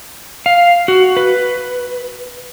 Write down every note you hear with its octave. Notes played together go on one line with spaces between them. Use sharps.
F5
F#4
B4